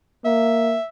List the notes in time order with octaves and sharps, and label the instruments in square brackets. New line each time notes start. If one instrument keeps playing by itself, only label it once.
[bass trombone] A#3 [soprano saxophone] E5